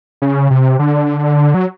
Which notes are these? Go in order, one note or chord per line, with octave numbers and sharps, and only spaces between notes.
C#3
C3
D3
F#3